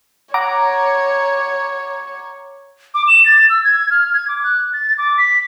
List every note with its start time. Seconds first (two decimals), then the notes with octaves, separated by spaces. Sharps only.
0.34 C#5 F#5 A#5 D6
2.94 D6
3.08 E7
3.26 A6
3.50 E6
3.64 G#6
3.91 F6
4.13 G#6
4.28 D6
4.44 F#6
4.73 A6
4.98 D6
5.18 B6